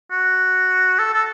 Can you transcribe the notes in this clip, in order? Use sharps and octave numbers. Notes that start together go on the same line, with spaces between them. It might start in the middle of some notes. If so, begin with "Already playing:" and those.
F#4
A4
A4